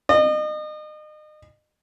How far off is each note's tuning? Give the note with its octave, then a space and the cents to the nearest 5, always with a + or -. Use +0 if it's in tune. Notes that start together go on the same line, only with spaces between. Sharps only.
D#5 -35